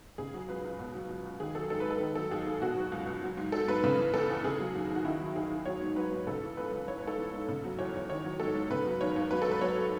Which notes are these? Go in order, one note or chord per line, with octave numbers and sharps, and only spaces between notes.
C#3 G#4
F#3
C#2 B4
C#2
B2
F#3
C#2
C#2
D#3 G#4
F#3 A4
G#2 A4
B4
G#2
A4
D#3
F#3 A4
D#2 G#4
D#2
B2 F#4
F#3
C#2
C#2
F#3
G#2
F#3 A4
G#2 B4
C#3 B4
E3
E2 A4
E2
C#3 G#4
F#3
D#2
D#2
F#4
D#3 E4
F#3
D#2 G#4
D#2
F#3 C#5
G#2
F#3 B4
G#2
C#3 A4
E3
C#2 B4
C#2
E3 C#5
G#2 B4
A4
E3
G#2
C#3
F#3
E2 C#5
E2 C#5
D#3 C#5
F#3
G#2 A4
G#2
C#3 B4
F#3
D#2 C#5
D#2
F#3 B4
G#2 A4
B4
F#3 C#5